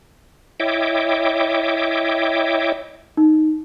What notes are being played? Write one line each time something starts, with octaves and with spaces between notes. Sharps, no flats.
E4 C#5 D#5 E5 G5 D6
D#4